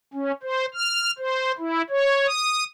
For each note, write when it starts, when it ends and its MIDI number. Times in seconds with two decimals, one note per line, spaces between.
0.14 0.32 61
0.43 0.66 72
0.74 1.11 89
1.19 1.52 72
1.58 1.82 64
1.90 2.27 73
2.27 2.64 87